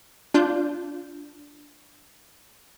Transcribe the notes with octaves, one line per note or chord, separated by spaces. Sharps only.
D4 F4 G6